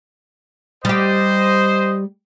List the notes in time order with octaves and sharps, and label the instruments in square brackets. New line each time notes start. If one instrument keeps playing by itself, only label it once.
[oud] G3 G4 [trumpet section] C5 D#5